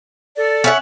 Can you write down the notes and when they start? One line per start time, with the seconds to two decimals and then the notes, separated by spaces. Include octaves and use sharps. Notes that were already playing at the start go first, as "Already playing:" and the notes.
0.36 A4 D5
0.64 C#4 E5 F#5